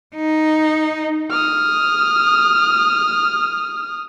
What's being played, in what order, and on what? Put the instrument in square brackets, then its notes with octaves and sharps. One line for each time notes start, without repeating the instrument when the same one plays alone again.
[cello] D#4
[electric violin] D#6 F6